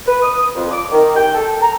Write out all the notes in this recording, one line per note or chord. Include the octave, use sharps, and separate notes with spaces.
B4
D#6
F2
D6
D#3
G5
A4
A#5